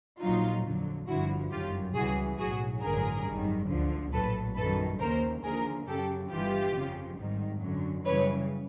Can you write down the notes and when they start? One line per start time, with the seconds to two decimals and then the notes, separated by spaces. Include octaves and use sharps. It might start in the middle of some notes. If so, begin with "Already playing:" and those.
0.21 A#1 A#2 F#3 D#4 F4
0.64 F2 D3 F#3
1.08 G1 G2 D3 F3 E4 F#4
1.51 G1 F#2 D#3 F#3 F4 G4
1.95 C#2 C#3 E3 G3 F#4 G#4
2.38 B1 A2 F#3 F#4 G#4
2.83 A1 G2 D3 F#3 G#4 A#4
3.26 G#1 F#2 D#3 G3
3.69 D2 D3 F3
4.13 A#1 A2 F#3 A4 B4
4.56 F#2 D#3 G3 A4 B4
5.00 D#2 C#3 F#3 A#4 C5
5.43 D#2 D3 F3 G#4 A#4
5.88 F#2 C#3 F#3 G4 A4
6.31 G1 G2 E3 G3 F4 G4
6.75 F2 C#3 F3
7.18 G#1 G#2 D#3 G3
7.61 F#2 D3 F#3
8.05 F#2 C#3 E3 G3 B4 C#5